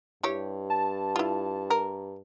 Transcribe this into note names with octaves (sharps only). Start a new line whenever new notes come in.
G2 E4 G4 C#5
A5
E4 F4
A#4